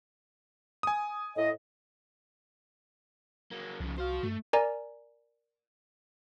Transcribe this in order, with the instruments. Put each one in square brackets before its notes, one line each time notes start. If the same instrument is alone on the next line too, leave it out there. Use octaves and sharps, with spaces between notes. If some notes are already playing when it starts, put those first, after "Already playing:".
[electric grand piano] G#5 D#6
[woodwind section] A2 D#5
[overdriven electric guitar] F#3 A#3
[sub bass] C2 [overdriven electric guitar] F2 C#3
[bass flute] F#4 [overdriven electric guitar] C5 F5
[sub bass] G2 [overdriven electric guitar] A3
[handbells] A#4 D5 G#5 A#5